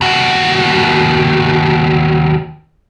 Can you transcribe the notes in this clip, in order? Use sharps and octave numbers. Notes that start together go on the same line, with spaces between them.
D#2 F#4